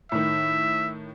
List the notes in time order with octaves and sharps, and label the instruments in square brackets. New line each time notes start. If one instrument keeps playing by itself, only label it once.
[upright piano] A2 D#3 [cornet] E5